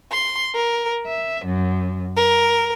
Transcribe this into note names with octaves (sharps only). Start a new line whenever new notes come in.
C6
A#4
E5
F#2
A#4